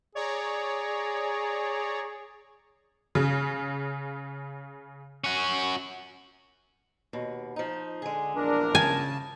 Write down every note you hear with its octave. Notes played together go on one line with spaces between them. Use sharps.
G#4 C#5 D5 A#5
C#3
C#4 F#4
D#2 B2
F3 D#4
D3 G#3 G#4
A#1 E2 D4 A#4
C#3 G#5 A5